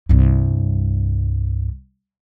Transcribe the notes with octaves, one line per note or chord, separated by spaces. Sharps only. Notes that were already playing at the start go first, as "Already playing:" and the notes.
C2 G2